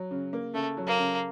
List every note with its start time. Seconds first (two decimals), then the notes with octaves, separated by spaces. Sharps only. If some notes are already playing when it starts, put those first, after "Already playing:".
Already playing: F#3
0.11 C#3
0.33 A#3
0.54 C#3 A3
0.77 F#3
0.87 A#3
0.99 C#3